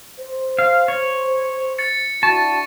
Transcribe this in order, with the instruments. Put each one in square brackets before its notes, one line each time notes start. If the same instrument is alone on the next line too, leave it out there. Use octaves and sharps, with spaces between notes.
[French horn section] C5
[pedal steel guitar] F5
C#5
[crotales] A6 C#7
[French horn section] D4 E4 F#4 [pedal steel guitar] A5 [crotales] C#6